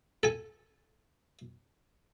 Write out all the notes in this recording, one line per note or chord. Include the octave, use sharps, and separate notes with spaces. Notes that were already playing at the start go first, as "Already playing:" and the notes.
A4 G#5